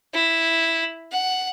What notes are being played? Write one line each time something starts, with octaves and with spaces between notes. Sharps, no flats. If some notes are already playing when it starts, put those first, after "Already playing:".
E4
F#5